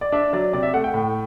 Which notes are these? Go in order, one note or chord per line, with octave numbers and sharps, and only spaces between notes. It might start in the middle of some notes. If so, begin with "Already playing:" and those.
D5
D4 E5
F#3 D5
C3 D5
E5
A3 F#5
G5
A2